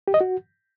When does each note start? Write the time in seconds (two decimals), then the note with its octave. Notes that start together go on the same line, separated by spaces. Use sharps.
0.08 G4
0.14 D#5
0.21 F#4